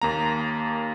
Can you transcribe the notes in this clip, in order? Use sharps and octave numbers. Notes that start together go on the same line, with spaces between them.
D#2 A#3 A#5